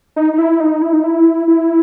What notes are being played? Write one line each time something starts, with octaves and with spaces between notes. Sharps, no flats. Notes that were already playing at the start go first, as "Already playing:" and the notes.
D#4
D#4
E4
D#4
E4
D#4
E4
E4